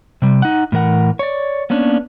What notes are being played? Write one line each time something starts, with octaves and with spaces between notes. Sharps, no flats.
C3 G3
D#4 F#5
A2 E3 A#4 F#5
C#5 D5
A#3 B3 C#4 D4 C#5